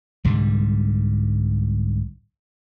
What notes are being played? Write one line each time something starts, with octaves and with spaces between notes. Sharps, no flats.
C2 G#2 D3 G3